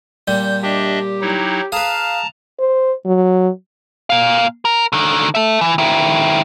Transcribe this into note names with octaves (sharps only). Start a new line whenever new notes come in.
A#2 G3 G6
D4 G4 D#5 E5
F#3 D#4 E4
G#4 B4 F5 A5 A#5
C5
F#3
A#2 F5
A#4
D3 D#3
A4 E5
E3
D#3 E4